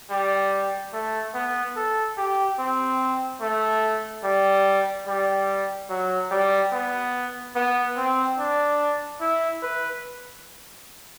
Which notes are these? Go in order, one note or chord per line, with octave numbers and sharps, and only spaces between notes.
G3
A3
B3
A4
G4
C4
A3
G3
G3
F#3
G3
B3
B3
C4
D4
E4
B4